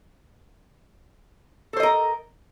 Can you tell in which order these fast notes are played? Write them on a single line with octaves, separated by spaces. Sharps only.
A4 C5 D#5 A#4